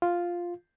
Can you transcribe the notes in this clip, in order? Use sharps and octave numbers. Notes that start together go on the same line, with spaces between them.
F4